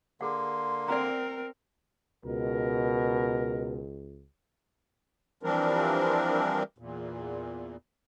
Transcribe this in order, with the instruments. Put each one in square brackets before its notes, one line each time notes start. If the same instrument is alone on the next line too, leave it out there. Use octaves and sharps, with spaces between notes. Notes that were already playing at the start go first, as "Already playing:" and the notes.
[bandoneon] D3 A#3 [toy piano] G#4 F#5 [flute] C6
[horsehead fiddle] C4 A#4 [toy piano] D5 F#5 A#5
[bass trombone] C#2 [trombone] B2 [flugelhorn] A#4
[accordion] E3 F3 G3 C4 D4 A#4
E2 A#2